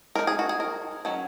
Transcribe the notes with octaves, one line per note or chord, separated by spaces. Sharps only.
G#3 D#4 A#4
G#4
F#4
G#4
A#4
D#3 F#3 C#4